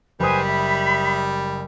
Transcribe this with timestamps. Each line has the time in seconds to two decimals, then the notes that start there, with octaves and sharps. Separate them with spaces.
0.20 F#1 G3 B4 C5 G#5 D#6
0.44 E5 B5